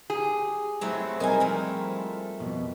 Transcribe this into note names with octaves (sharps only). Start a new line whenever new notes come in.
G4 G#4
F#3 G#3 A3 C4 E4
G3 C4 D#4 A#4 C5 G#5
F3 A3
F2 B2